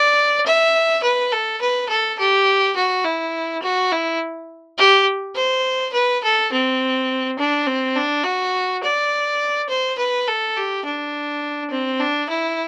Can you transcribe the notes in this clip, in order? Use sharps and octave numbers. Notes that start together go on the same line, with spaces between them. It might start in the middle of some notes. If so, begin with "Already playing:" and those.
Already playing: D5
E5
B4
A4
B4
A4
G4
F#4
E4
F#4
E4
G4
C5
B4
A4
C4
D4
C4
D4
F#4
D5
C5
B4
A4
G4
D4
C4
D4
E4